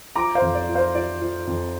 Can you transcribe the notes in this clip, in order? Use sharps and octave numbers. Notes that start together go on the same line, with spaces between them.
F3 A#5 D6
C5 F5
F2
D5
F3
C5 F5
F3 D5
F3
F2